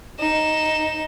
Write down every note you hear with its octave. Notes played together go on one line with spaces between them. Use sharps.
D#4 E7